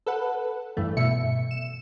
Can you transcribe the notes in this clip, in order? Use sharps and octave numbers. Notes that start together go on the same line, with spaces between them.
A4 B4 F#5
G2 E3 A3
B2 E5 C#7
E7